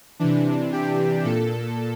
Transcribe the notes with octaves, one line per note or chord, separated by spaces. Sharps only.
C3 E3 D4
G4
A#2 A4